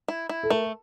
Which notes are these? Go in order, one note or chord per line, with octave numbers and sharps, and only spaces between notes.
E4
E4
A4
A3 A#4